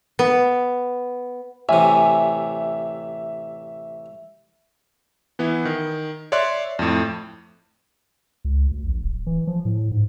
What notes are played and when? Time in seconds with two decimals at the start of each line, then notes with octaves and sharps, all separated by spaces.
0.19 B3
1.69 A1 C3 E5 G#5
5.39 E3 B3 E4
5.65 D#3
6.32 C#5 D5 E5 C6 F#6
6.79 F2 A2
8.45 C#2
8.72 D2
8.86 A#1
9.03 D1
9.27 E3
9.47 F3
9.65 A2
9.91 G#2